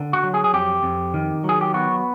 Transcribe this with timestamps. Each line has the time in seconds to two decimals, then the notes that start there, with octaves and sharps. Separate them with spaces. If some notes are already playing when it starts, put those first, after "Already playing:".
Already playing: D3
0.13 F#4
0.24 F#3
0.34 G#4
0.44 G#4
0.53 F2 G4
0.83 F2
1.14 D#3
1.44 F#3 G#4
1.61 G4
1.74 B3 F#4